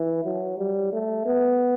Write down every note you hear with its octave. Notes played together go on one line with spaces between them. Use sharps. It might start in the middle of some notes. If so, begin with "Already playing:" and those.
Already playing: E3
F#3
G3
A3
B3